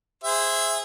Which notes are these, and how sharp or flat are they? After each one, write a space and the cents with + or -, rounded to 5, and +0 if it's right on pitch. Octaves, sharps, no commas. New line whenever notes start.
G#4 -15 C5 +0 E5 +0